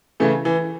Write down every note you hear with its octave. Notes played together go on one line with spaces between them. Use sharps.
C#3 E3 A3
E3